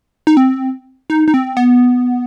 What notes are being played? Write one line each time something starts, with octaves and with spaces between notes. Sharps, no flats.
D#4
C4
D#4
D#4
C4
B3